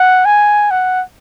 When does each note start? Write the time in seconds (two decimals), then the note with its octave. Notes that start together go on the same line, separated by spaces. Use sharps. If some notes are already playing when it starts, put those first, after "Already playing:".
Already playing: F#5
0.25 G#5
0.71 F#5